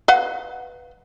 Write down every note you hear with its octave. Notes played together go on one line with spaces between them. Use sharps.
B4 F5 F#5